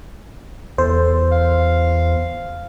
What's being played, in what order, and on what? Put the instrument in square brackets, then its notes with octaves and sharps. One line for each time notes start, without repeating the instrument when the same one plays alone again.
[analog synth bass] E2 [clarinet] A4 [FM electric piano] C5
[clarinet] F5